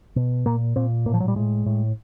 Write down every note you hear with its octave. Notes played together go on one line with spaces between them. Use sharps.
B2
A#2 A#3
A#2 C4
A2 A#3
F3
F#3
G3
A2 G#3
A2